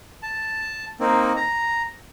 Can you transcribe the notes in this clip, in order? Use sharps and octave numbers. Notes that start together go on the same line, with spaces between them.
A5
A#3 C4 D#4
A#5